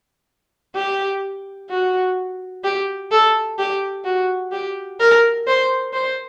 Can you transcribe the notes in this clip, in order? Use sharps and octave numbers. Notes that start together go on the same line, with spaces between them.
G4
F#4
G4
A4
G4
F#4
G4
A#4
C5
C5